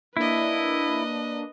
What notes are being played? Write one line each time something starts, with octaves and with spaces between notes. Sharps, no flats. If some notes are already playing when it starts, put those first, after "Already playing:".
A#3 D4 E4 B4 D#5